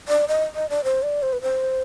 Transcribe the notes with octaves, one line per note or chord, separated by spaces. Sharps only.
D5
D#5
D#5
D5
C5
D5
C5
B4
C5